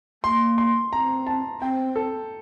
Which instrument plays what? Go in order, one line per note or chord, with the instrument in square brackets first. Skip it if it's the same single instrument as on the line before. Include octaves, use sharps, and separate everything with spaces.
[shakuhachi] A#3 [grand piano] C6
[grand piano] C6
[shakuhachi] C4 [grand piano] A#5
[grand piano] A5
[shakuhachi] C4 [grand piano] G5
[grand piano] A4